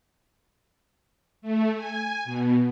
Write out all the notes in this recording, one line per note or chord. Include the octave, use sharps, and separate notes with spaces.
A3
G#5
B2